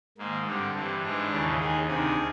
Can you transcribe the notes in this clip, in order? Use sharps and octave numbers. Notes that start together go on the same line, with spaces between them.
G#2 D#3 A#3
G2 D3 C4
G2 E3 C4
G#2 E3 D4
D#2 C#3 E3
D#2 D#3 G#4
D2 C3 D#3 G#4